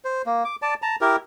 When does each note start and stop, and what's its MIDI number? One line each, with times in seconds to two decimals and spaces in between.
0.05 0.22 72
0.26 0.44 58
0.44 0.56 86
0.62 0.74 74
0.62 0.74 81
0.82 0.96 81
0.82 0.96 82
1.01 1.16 64
1.01 1.16 67
1.01 1.16 70